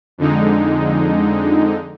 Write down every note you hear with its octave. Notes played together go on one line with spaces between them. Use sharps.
F2 D3 G#3 D#4